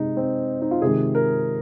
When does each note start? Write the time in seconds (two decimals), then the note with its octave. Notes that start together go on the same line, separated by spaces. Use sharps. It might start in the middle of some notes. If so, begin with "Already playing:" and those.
Already playing: C3 G#3 D#4
0.17 C4
0.62 D#4
0.71 F4
0.82 C3 D#3 G#3 G#4
1.15 A#4